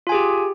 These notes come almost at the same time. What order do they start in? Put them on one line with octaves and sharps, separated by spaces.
F4 G#5 G#4 G4